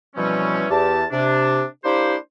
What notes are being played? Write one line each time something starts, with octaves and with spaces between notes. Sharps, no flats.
B2 E3 F3 G3 C4 C#4
E2 G4 A5
C3 D4
A#3 D4 E4 G4 C5